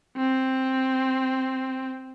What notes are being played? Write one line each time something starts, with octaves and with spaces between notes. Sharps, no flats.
C4